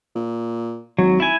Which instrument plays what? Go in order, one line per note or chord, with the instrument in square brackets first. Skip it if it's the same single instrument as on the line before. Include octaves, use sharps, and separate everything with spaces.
[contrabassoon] A#2
[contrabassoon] G#1 [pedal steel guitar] F#3
[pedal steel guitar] E4 G#5